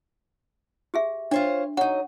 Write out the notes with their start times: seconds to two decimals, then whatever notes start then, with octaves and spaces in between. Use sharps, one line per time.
0.94 G4 G#4 E5
1.31 D4 F4 C5 C#5
1.77 F#3 D#4 F#5